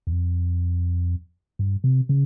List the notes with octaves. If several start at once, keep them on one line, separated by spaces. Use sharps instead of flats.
E2
F2
G2
C3
C#3